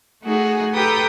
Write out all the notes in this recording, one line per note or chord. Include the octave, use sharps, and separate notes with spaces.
A3 D#4 F#4 G#4
G4 A4 B4 G5 A#5 D#6